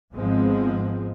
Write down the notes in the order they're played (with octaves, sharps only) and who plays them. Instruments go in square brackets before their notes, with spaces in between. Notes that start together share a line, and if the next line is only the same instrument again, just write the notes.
[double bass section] G#1 G#2 F3 G#3 B3 C4